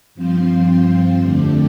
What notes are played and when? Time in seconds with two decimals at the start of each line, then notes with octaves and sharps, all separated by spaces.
0.15 G2 F3 C4 F4 C5
1.20 F2 D3 A3 D4 G4